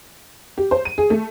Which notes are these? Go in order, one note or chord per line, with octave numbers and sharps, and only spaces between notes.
G4
C5
D#7
G#4
A3